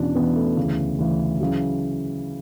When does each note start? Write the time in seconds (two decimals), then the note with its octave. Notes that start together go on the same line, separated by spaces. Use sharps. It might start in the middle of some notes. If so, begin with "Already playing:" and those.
Already playing: E2 B2 C#4 D4
0.15 E2 B2 B3
0.36 A3
0.57 D2 C#3 E3
0.99 D2 C#3 E3
1.40 C#3 E3 F#3